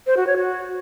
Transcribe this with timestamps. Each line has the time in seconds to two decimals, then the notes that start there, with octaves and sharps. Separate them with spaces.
0.07 C5
0.17 F#4
0.27 C#5
0.37 F#4